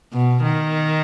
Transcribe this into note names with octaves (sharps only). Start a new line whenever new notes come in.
B2
D#3